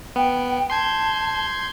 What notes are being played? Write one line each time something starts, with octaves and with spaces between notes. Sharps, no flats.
B3 G5
A5 C6 G6 G#6